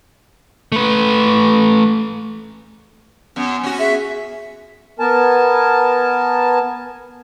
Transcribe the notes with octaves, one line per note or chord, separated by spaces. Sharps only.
A3 B4
F#2 B3
C#4 F#4
G#4 E5
B3 A#4 G#5 A5